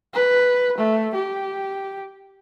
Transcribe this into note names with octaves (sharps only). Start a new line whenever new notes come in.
B4
A3
G4